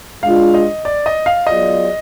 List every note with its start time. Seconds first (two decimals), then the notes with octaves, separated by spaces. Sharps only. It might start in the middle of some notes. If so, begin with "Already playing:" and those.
0.23 G#3 D4 F4 F5
0.54 D#5
0.85 D5
1.06 D#5
1.26 F5
1.47 F#3 B3 F4 G#4 D5 D#5